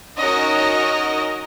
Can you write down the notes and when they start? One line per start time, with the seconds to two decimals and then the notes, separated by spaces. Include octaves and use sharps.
0.18 C#4 D#4 F#4 A#4 C#5 D#5